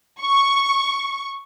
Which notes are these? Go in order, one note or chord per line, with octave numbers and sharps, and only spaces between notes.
C#6